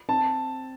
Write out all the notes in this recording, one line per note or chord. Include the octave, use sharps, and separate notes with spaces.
C4 A5